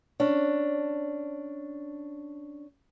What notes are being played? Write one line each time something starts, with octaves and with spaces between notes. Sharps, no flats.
C#4 D4